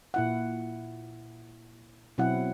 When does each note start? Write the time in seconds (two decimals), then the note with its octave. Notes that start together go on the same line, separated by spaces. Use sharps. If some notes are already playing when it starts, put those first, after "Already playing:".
0.14 A#2 E4 F#5
2.18 B2 F#3 C4 E4 F#5